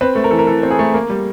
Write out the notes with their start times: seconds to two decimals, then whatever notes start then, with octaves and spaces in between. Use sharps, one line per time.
0.01 C4 B4
0.15 A3
0.24 A#4
0.31 E3 A4
0.39 A#4
0.47 E3 A4
0.63 C4
0.71 G#4
0.79 A3
0.94 A#3
1.10 G3